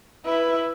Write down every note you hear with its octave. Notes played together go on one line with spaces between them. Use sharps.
E4 B4